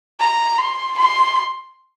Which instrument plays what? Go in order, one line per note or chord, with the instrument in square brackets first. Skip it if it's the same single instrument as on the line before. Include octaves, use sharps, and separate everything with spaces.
[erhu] A#5
C6
C6